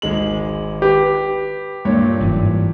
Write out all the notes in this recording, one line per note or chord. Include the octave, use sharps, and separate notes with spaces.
G#1 G#3 F#7
G4 B4
G2 A#2 C#5
F#1 G#2 E3